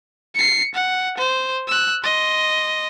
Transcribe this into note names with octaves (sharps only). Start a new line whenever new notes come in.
C7 C#7
F#5
C5
E6 F#6
D#5 C6